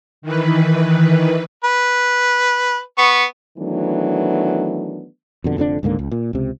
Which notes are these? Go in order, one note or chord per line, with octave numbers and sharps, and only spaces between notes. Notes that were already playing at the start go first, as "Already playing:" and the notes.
D#3 E3 B4
B4
B3 C#6
D#3 E3 F#3 A3 B3 D4
F2 B2 D3
F1 F2 D3 D4
C#2 G#2 D3 A#3
C#2
A#2
C#2 C3